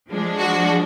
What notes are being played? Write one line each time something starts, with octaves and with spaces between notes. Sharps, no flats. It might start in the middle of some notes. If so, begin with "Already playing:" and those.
F3 G#3 D4
F#4